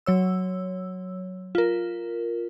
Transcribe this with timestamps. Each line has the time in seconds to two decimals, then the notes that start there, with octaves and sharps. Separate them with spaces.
0.06 F#3 C#5 E6
1.55 F4 A#4